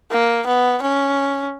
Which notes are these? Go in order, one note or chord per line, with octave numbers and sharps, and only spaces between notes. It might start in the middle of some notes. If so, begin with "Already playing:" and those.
A#3
B3
C#4